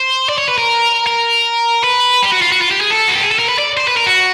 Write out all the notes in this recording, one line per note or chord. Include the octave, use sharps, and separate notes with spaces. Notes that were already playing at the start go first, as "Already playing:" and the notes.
Already playing: C5
D5
C#5
B4
A#4
A#4
B4
G4
F#4
F4
F#4
F4
G4
G#4
A4
F#4
G4
G#4
A4
A#4
B4
D5
C5
B4
A#4
F#4